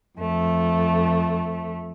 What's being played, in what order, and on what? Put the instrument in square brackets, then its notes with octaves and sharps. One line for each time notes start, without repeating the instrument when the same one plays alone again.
[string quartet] F2 A3